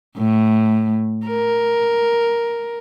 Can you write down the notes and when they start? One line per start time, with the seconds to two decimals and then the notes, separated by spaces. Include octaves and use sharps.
0.18 A2
1.27 A#4